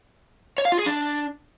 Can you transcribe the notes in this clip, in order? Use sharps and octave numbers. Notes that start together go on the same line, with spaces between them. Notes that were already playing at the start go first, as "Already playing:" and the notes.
C#5
F5
F4
G#4
D4